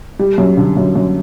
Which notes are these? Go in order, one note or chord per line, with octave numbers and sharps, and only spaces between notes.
G3
F#2
D3
F#2
F#2